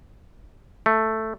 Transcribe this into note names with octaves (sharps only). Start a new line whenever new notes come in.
A3